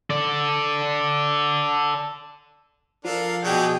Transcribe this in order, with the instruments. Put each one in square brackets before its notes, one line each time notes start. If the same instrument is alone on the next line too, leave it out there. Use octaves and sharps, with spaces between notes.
[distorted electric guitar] A4 D5
[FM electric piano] F3 [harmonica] D4 A4 [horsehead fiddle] A#4 F5
[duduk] B2 [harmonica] F#3 D4 G4 [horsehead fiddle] G#4 G5